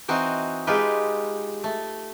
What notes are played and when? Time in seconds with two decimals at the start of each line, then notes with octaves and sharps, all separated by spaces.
0.08 E3 C4 D#4 F#4
0.67 G#3 D#4 F4 G4 B4
1.64 A3